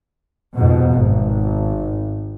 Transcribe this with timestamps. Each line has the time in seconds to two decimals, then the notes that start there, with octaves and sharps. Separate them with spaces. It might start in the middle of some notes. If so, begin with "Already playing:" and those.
0.55 F2 G#2 B2
0.92 G#1